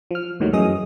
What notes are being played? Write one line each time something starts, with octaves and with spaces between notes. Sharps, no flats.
F3 F6
D#2 A2 D#3 F#3 G3
F#2 E3 F#3 G#4 D#5 D#6